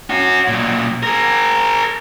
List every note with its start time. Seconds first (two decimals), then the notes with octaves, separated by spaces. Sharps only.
0.10 C#4 F#4
0.48 B1 A#2
1.03 G#4 A#4